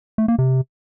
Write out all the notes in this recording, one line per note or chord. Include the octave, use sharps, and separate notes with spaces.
A3
A#3
C3